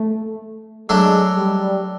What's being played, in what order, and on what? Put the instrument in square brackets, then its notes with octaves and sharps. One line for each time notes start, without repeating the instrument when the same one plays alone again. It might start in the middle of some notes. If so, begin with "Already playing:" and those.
Already playing: [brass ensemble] A3
[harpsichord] F#3 A3 D4 [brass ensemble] G#3
[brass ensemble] G3